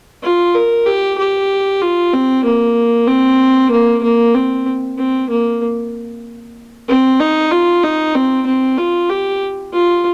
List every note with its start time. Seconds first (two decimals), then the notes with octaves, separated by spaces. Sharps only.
0.23 F4
0.54 A#4
0.86 G4
1.18 G4
1.81 F4
2.13 C4
2.45 A#3
3.08 C4
3.71 A#3
4.03 A#3
4.34 C4
4.98 C4
5.29 A#3
6.88 C4
7.20 D#4
7.51 F4
7.83 D#4
8.15 C4
8.46 C4
8.78 F4
9.10 G4
9.73 F4